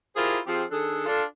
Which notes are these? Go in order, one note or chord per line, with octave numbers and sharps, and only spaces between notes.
E4 F4 G4 G#4 A#4 C5
F3 C4 F4 G4 G#4
D#3 D4 G#4 A4
D4 F4 A4